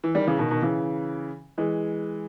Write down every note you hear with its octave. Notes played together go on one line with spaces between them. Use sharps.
E3
D#3 G3
C#3 E3
B2 D#3
B2 D#3
C#3 E3
E3 G#3